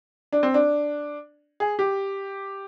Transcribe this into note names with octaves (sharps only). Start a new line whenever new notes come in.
D4
C4
D4
G#4
G4